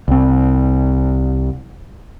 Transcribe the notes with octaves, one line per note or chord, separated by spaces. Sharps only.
C2 C4